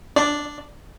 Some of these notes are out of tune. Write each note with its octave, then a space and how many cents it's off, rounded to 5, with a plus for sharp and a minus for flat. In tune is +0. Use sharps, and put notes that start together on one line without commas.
D4 +0 D5 +0